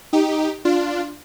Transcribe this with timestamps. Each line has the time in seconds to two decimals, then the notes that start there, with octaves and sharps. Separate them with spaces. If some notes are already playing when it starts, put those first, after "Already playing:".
0.13 D#4 G4
0.65 D4 F4